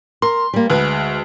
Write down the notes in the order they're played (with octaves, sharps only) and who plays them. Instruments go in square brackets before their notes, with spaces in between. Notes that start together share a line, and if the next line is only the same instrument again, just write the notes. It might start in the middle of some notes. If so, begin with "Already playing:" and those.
[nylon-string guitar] A#4 [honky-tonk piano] C6
[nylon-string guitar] G3 A#3
[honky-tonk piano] D2 [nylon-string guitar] G#3 B4